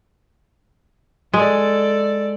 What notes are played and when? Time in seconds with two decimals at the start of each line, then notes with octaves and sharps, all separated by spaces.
1.34 G#3 A4 D5